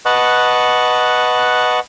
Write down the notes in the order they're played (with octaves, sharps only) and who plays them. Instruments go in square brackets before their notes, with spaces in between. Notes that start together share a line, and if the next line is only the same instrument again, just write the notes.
[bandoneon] B4 D#5 F#5 A5 C#6